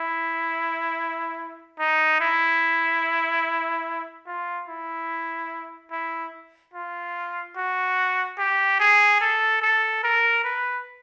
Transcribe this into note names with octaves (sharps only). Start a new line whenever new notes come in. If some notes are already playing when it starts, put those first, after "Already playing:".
Already playing: E4
D#4
E4
F4
E4
E4
F4
F#4
G4
G#4
A4
A4
A#4
B4